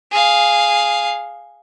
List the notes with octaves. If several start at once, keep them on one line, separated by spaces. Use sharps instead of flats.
G#4 F5